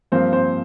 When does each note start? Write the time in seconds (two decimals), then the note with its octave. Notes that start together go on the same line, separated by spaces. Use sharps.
0.12 G2 F3 A#3 C4 C5
0.33 C4 C5